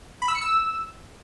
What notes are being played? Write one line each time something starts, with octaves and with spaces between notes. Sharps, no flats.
B5
E6
C#7
E6